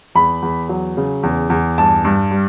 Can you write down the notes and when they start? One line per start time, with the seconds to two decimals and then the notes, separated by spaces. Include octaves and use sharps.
0.15 E2 B5
0.42 E2
0.69 F#3
0.97 C#3
1.23 E2
1.50 E2
1.78 G2 A5
2.05 G2
2.31 G3